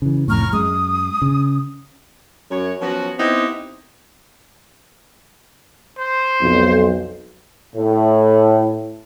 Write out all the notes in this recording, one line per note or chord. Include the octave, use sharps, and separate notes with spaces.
C#3 E3
C2 F2 A2 A#5 C#6 F6
F#2 G#3 D#6
C#3
F#2 C#5
F3 F#3 B3 C#4 F#4
B3 C4 D#4 E4 G4
C5
B1 F2
A2